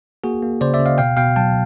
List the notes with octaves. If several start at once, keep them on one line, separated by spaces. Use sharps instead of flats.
A#3 F#4 G#4
A#3
C#3 C5 D5
D5 E5
C#3
D#5 F5
B2 F5 G5
B2 F5 G5
F#3 G5 A5